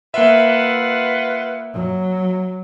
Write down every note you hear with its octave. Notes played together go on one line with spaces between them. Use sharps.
A#3 F4 B4 E5 F#5
F#3